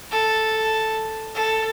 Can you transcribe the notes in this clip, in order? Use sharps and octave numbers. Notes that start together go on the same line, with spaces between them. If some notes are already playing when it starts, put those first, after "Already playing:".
A4
A4